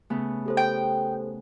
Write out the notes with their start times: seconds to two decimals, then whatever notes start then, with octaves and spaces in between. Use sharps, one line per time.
0.10 C#3 A3 B3
0.46 G4 A4 C5
0.57 G5